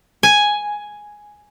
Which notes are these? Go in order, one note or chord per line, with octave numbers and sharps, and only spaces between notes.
G#5